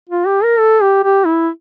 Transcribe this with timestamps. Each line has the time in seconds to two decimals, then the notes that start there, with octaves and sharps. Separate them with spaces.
0.09 F4
0.26 G4
0.43 A#4
0.59 A4
0.82 G4
1.04 G4
1.25 E4